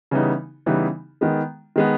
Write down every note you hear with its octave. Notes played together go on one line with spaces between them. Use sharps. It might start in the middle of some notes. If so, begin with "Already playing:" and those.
C#3 E3 G3 B3 D#4
C#3 E3 G3 B3 D#4
D#3 G#3 B3
D#3 G#3 B3